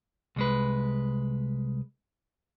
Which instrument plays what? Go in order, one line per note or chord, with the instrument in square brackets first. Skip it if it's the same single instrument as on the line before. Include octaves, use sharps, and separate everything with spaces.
[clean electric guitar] C2 G#3 B4